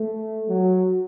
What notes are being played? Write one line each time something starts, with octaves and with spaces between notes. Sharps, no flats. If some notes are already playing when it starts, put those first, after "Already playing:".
Already playing: A3
F#3